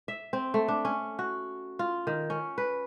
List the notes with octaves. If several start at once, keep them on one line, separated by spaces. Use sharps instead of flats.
E5
C4
A3
D4
C#4
F#4
F4
D#3
C#4
B4